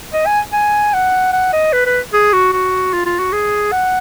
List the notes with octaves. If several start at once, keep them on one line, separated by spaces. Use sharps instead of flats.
D#5
G#5
G#5
F#5
F#5
D#5
B4
B4
G#4
F#4
F#4
F4
F4
F#4
G#4
F#5